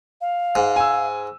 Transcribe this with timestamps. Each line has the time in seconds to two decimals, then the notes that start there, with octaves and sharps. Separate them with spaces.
0.21 F5
0.55 G#2
0.76 G#5 E6